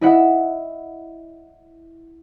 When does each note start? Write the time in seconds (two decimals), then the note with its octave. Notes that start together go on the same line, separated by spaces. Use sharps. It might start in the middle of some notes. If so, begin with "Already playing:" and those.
0.01 E4 D#5 E5 F#5